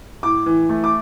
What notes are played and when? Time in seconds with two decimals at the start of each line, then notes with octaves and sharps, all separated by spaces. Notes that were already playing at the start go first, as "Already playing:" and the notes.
0.23 A2 D6
0.46 E3
0.69 A3
0.84 D6